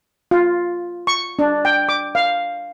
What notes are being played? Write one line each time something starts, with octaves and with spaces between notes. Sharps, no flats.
F4
C#6
D4
G5
D6
F5